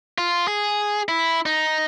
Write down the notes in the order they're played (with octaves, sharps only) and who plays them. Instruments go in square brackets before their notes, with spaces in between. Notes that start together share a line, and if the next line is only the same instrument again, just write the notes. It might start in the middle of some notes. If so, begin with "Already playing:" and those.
[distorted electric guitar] F4
G#4
E4
D#4